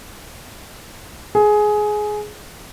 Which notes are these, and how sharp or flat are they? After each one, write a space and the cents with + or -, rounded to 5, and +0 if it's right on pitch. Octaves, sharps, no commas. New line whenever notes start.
G#4 +15